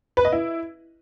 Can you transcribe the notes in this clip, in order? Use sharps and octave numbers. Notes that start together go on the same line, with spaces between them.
B4
D#5
E4